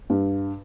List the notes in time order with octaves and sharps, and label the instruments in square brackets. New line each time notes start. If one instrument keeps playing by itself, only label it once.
[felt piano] G2